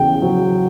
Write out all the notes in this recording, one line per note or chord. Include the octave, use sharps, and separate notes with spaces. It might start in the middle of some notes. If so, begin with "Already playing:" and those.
Already playing: E2 C#3 G5
F#3